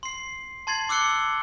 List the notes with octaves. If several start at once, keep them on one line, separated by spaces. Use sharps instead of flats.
C6 C7
A5 C6 G#6 A6 C7 F#7
D6 E6 F#6 C#7 G7